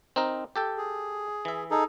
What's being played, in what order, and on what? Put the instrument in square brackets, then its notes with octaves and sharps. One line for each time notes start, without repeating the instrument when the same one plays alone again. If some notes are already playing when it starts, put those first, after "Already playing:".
[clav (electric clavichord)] C4 D#4 A#4
G4 A4 G5
[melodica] G#4
[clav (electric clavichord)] E3 E5
[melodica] D#4 G#4 A4